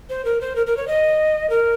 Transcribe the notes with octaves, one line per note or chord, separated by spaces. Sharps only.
C5
A#4
C5
A#4
A#4
C#5
D#5
A#4